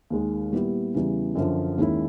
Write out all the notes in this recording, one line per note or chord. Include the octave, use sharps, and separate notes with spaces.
D#2 D#3 G#3
A#2 G3 B3 E4 G4
E2 C#3 E3 G3
F#2 D3 F3
D#2 D#3 G#3 C#4 E4